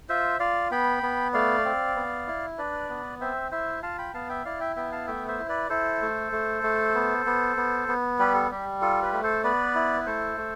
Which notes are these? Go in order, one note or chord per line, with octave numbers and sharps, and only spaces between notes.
F4 C5 E5
F4 D5 F5
B3 G5 B5
B3
A3 D5 F5
C4
B3
E4
D4 B4 D5
B3
C4 C5 E5
E4 C5 E5
F4 F5 A5
G5 B5
B3 F5 A5
E5 G5
E4 D5 F5
E5 G5
B3 E5 G5
F5 A5
A3 E5 G5
C5 E5
E4
B4 D5
E4 A4 C5
A3
A3
A3
B3
B3
B3
B3
G3 G4 B4
A4
G3 G4
F4 A4
G4 B4
A3
A4 C5
B3 B4 D5
E4
B4
A3 A4 C5
A3